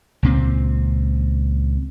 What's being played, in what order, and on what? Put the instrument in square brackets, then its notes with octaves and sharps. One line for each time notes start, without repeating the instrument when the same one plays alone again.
[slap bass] C#2 A#2 C4